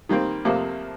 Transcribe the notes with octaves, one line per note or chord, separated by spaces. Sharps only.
D#3 G3 A#3 C4
F2 C3 F3 A3 A#3 D6